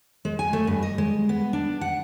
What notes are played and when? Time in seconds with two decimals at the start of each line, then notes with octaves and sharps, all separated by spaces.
0.25 G#3
0.39 G#5
0.53 A3
0.67 G2
0.83 D#5
0.98 G#3
1.29 B3
1.53 D4
1.81 F#5